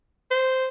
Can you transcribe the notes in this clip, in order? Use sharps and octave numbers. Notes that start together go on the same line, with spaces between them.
C5